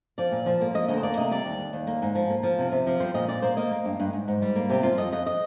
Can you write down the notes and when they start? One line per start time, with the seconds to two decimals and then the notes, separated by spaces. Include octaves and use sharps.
0.18 F3 D5
0.32 A#2
0.46 F3
0.61 A#3
0.74 A#3 D#5
0.88 D2 D#5
0.97 C5
1.03 A#3 D5
1.17 C3 D#5
1.31 G3 D5
1.46 D#2
1.59 D#2
1.73 D#2
1.87 A#3
2.02 G#2
2.15 F3
2.30 A#3
2.43 F3
2.59 C3
2.71 C3
2.86 F3
3.00 G3 C5
3.14 A#2 D#5
3.28 A#2 D5
3.42 A#3 C5
3.57 A#3 D#5
3.71 A#3
3.85 G2
4.00 G2
4.13 G#2
4.28 G#2
4.42 G3
4.55 A#3
4.70 C3 G4
4.83 F3 F4
4.97 F2 D#5
5.12 F2 D#5
5.26 D#5